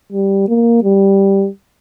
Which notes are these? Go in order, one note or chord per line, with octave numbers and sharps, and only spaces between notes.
G3
A#3
G3